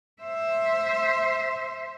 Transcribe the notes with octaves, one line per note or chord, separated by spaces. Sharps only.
C5 E5